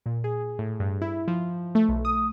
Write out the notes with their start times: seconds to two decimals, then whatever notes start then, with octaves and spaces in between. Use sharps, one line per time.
0.06 A#2
0.24 G#4
0.59 A2
0.80 G2
1.02 E4
1.28 F3
1.75 A3
1.89 B1
2.05 D#6